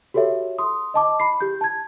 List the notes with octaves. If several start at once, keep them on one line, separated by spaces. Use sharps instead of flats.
F#4 G4 A4 C#5 E5
C6 D#6
D#5 A5 D6
B5 C7
G4 G6
A5 G#6